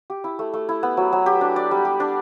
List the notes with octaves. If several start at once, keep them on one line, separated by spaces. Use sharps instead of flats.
G4
E4
A3
A3
E4
B3
F#3
F#3
G4
D4
D5
G3
G4
D4